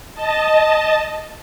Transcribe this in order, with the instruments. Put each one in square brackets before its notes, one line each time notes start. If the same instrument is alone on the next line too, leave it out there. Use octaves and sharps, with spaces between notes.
[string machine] D#5 A5